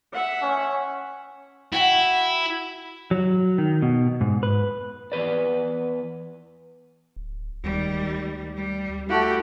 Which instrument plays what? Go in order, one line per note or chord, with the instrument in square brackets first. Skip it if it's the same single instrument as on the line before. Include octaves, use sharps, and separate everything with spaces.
[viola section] E5 F#5
[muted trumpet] C#4
[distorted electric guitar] E4 [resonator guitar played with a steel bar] F#4 F#5 G5
[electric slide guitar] F#3
D#3
B2
G#2
B4
E2 B4 D5
[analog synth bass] D1
[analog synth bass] D2 [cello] D#3 G3
[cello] G3
[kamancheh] A3 F#4 [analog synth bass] E4 [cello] G4